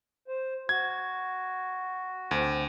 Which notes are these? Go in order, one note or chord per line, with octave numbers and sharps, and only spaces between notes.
C5
F#4 G#6
D2 C4